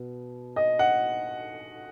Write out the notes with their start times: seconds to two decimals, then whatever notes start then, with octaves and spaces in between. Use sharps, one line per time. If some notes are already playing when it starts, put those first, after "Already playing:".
Already playing: B2
0.56 D#5
0.79 F#5